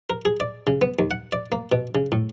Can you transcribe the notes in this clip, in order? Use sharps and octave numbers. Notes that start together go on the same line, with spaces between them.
A#4
G#4
D5
C#3
B3
D#2
F#5
D5
A#3
B2
C#3
A2